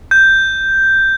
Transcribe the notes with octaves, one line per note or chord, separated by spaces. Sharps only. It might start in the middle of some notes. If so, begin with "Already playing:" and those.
G6